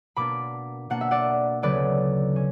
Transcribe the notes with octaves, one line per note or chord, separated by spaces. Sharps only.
B2 A#3 D4 B5 D6
B2 A#3 D4 F#5
E5
D5 F#5
D2 C#3 F#3 C#4 B4 D5
C#4